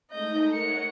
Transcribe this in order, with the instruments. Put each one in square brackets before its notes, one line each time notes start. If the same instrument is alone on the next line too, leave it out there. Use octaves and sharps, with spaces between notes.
[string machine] G#3 A3 D#4 [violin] D#5 G6
[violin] A#4 C#7 [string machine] C#5 D#5 F#5